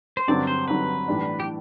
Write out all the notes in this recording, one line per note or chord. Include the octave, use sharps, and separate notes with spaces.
C5
G2 D3 F#3 C4 D5
C5
G2 D3 F#3 C4 B4
A2 E3 G3 D4
G4